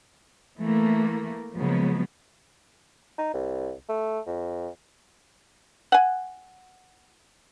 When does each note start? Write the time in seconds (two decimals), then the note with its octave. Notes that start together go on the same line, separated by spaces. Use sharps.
0.61 E3 A3 A#3
1.56 C#3 F3 F#3 G#3 A#3 B3
3.18 D#4
3.34 C2
3.89 A3
4.27 F2
5.92 F#5 G#5